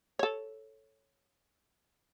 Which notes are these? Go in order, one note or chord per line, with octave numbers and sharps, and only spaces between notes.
A4 C#5